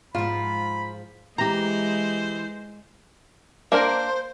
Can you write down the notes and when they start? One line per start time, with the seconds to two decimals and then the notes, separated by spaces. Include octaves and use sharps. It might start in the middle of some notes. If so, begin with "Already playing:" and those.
0.15 G#2 F3 F4 B5
1.38 E3 G#3 G4 C5 A#5
3.72 A#3 D4 A#4 C5